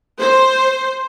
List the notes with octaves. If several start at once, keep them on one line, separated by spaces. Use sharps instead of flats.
C5